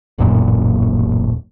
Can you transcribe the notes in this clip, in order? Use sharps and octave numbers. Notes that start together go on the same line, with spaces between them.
D#1 A1 F#2 A#2